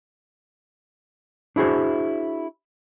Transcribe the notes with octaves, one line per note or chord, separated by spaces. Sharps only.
D4 E4 F#4 G#4 C5